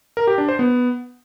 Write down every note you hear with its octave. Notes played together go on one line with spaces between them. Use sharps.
A#4
G4
D4
C5
B3